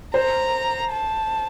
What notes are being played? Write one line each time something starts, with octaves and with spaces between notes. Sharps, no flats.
C5 A#5
A5